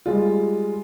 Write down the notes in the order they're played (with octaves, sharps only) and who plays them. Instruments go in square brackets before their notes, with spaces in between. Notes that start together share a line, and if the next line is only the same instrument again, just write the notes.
[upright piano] G3 G#3 F4